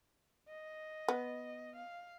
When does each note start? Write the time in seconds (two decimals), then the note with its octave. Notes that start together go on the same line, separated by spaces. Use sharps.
0.48 D#5
1.08 B3
1.76 F5